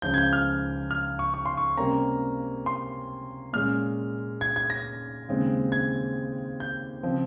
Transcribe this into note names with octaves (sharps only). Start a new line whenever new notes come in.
C#2 C#3 F3 G6
G#6
G6
F6
F6
C#6
C#6
C6
C#6
C3 G3 A#3 C#4 A#5
C6
A#2 G#3 C#4 F6
G#6
G#6
A#6
D#2 C#3 G#3 C4
G#6
G6
C#3 F3 C4